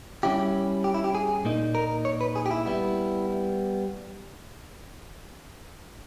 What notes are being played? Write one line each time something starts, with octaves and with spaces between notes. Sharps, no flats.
G3 C#4 E4 G4
G4
E4
G4
G#4
A#2 A#3 D#4
A#4
C#5
B4
G#4
G4
E4
G3 B3 E4